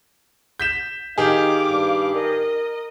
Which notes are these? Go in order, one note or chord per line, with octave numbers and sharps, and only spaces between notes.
G6 B6 E7
D#3 D#4 G4 G#4 F5 D6
G2
A#4 D#5